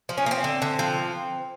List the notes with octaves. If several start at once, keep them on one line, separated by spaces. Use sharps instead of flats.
F3
C#4
A#3
C4
D3
D3
F3